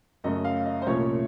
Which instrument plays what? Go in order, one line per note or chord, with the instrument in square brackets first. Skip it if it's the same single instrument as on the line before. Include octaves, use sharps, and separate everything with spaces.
[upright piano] F#2 C#3 A3 D#5
F5
D#5
C5
C2 A#2 F3 A3 C#4 C#5